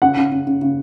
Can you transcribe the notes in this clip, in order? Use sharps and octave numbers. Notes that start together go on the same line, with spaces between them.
C#3 F#5
C#3
C#3
C#3
C#3